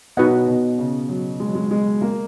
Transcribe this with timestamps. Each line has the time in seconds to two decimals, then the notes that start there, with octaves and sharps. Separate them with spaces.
0.17 B2 D#4 F#4 B4 D#5 F#5
0.47 B2
0.78 C#3
1.09 F#3
1.40 G#3
1.47 F#3
1.55 G#3
1.71 G#3
2.01 A#3